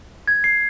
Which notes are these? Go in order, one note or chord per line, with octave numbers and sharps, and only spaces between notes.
G#6
C7